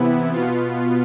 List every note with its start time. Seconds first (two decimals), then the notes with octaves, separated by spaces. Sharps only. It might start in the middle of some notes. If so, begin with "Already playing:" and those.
Already playing: C3 E3 B3 E4
0.33 B2 B3 F4